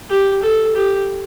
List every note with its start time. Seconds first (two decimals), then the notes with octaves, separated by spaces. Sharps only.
0.10 G4
0.42 A4
0.75 G4